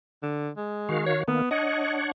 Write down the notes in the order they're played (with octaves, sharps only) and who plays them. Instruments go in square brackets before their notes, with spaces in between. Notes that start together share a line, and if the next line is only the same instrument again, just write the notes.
[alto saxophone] D3
G#3
[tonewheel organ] D#3 F#4 F5
[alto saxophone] C#5
[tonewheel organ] D#3 A#3 [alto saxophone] B3
[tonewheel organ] D4 C#5 F#5 [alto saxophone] D#5